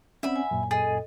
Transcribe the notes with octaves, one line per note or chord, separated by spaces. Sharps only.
C4 C#4 D5 E5 F#5 B5
G#5
F#2 A#2
G#4 A4 D#5